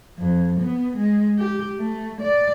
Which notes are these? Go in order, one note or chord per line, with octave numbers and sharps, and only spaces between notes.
F2
B3
G#3
G4
A3
D5